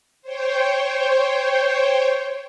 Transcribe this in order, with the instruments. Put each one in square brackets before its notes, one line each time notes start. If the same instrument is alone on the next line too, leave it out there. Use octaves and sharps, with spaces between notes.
[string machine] C5 C#5 G5